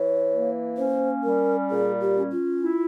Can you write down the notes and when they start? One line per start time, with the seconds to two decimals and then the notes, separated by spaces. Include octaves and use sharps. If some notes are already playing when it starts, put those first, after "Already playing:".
Already playing: E3 C#5
0.31 A#3
0.77 C#4 C5
1.23 G3 A#4
1.70 A#2 G#4
2.01 G4
2.16 C#4
2.31 F4
2.62 E4